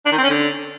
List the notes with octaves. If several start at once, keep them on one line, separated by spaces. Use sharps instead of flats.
D4
D#3
C4
C#4
D3